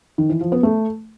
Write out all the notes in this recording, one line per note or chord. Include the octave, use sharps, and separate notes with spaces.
D#3
E3
F3
B3
A3